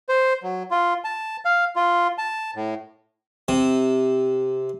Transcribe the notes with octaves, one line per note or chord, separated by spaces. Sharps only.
C5
F#3
F4
A5
F5
F4
A5
A2
C3